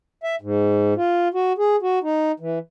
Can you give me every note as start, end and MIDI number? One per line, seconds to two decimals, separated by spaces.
0.24 0.35 76
0.41 0.94 44
0.96 1.28 65
1.34 1.53 66
1.58 1.76 68
1.82 1.99 66
2.03 2.32 63
2.40 2.59 52